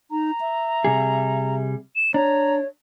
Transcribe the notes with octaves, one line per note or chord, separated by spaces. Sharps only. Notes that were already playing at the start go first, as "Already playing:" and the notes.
D#4 A#5
E5
C3 G3 G#4
E7
D4 C#5 A#5